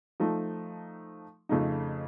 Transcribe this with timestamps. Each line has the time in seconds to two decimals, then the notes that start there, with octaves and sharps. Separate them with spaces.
0.20 F3 A3 D#4
1.49 F2 C#3 A3 D#4